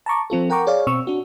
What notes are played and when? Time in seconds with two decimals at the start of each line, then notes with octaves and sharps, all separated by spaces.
0.06 A5 A#5 C#6 D6
0.30 F3 C4 F4 A4
0.50 A#4 F#5 G5 A#5 C#6 D6
0.67 G#4 C#5 D5 F5
0.87 B2 C4 C#6 E6
1.07 D4 F#4